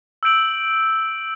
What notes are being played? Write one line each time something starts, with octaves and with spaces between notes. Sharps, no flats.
E6 G6 D7 F#7